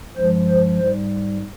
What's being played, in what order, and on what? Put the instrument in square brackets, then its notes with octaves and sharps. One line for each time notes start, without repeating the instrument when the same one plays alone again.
[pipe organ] G2 F3 G#3 C5
C5
G#2 G3 C5